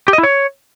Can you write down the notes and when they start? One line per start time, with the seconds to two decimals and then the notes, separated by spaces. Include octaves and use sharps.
0.08 G4
0.13 D#5
0.18 E4
0.23 C#5